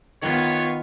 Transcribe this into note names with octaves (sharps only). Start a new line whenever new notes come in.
D#3 B3 F4 B4 C#5